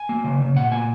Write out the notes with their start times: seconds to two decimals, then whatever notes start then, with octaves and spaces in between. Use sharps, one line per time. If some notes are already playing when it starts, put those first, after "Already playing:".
Already playing: G#5
0.09 A#3
0.24 C#3
0.40 C#3
0.56 A#2 F#5
0.72 A#2 G#5